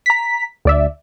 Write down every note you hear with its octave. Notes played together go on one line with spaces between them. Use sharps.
A#5 B6
D2 D5 E5